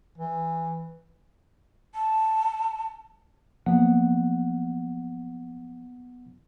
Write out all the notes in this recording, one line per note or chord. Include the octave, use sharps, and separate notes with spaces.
E3
A5
F#2 F3 A#3 B3 F#5